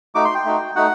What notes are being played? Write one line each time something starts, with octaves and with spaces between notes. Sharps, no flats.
A3 D#4 F#4 D6
C6
G5
A3 D#4 F#4
A3 D#4 F#4 F#5